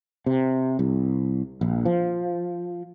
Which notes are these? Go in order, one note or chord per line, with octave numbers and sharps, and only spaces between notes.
C3
C2
A#1
F3